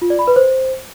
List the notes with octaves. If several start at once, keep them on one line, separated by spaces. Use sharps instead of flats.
F4
D5
B5
B4
C5